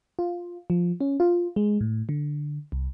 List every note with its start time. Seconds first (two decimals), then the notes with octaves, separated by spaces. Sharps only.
0.19 F4
0.70 F3
1.01 C#4
1.20 F4
1.56 G#3
1.81 A2
2.09 D3
2.72 C2